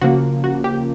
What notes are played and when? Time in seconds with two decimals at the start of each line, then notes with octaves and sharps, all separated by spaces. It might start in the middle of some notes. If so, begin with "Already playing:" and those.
0.01 C#3 F3 A#3 F#4
0.44 F#4
0.64 G4